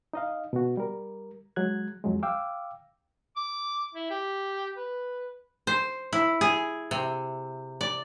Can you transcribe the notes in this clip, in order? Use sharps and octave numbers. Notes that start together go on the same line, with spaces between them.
D#4 D#5 F5
B2 F#4
G3 A#4
F#3 G#3 F#6 G#6
F2 F#3 G#3
F5 G5 D6 E6
D6
E4
G4
B4
C5
E4
G#4
C3
D5